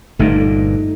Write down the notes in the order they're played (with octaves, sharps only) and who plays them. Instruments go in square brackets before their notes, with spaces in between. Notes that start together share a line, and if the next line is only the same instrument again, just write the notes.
[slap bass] G1 G2 A#2 [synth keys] A3 D#4